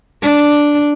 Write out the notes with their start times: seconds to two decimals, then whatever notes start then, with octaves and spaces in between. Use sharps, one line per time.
0.22 D4